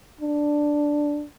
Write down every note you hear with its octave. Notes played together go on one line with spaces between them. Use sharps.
D4